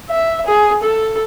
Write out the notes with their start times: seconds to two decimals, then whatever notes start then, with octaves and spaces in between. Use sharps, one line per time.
0.10 E5
0.47 G#4
0.83 A4